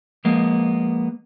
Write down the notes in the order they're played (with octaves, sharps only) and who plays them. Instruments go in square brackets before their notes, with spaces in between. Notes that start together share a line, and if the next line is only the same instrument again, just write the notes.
[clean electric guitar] F3 G#3 A#3 B3